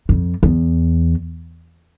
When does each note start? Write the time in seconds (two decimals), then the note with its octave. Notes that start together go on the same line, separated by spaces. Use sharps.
0.09 F2
0.43 E2